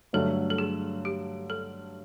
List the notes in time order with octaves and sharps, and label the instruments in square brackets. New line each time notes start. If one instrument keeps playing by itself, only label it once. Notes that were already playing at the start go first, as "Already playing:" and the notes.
[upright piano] G2 D3 F#3 A3 [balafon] A4
[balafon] A4
G#4
G4
A4